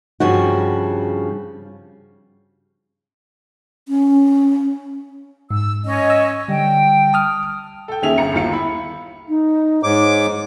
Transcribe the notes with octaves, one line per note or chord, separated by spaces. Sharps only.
G2 C#3 F3 F#4
C#4
G#2 E6
C#4 D#5
E6
D3 G3 G5
A5 D#6 F6
A4 G5
D#2 C#4 G#4 E5 F7
G1 A#5 C#7
G1 D#2 F4 C#7
E4 B5
D#4
G#2 C#5 D6